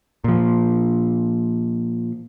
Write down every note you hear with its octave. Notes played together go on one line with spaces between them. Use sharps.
A#2 F3